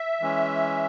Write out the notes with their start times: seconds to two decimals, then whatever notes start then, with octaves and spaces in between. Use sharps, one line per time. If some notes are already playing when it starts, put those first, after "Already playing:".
Already playing: E5
0.21 E3 G#3 C#4